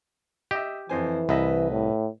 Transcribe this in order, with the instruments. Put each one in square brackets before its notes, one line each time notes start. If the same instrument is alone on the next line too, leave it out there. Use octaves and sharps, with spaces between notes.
[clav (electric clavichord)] G4 [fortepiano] D#5 E5
[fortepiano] F2 C5 G#5 [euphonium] E3
[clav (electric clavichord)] C2 [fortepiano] B4 D#5 E5
[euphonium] A2